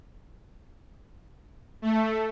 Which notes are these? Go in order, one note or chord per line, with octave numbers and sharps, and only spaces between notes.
A3